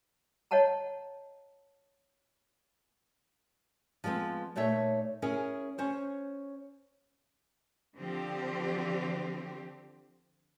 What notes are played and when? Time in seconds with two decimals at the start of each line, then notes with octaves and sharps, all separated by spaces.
0.51 C#5 D#5 F#5 A5 A#5
4.04 F3 G3 G#3 B3 C4
4.56 A#2 A3 D#4 C#5 E5
5.22 C#4 E4 G#4 A#4 C#5
5.78 C#4 C5 C#5
7.94 D3 F3 C4 G4